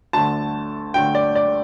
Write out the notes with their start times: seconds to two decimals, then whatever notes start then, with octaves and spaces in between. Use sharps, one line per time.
0.13 D2 D3 A3 A5
0.94 D2 D3 A3 G5
1.15 D5
1.35 D5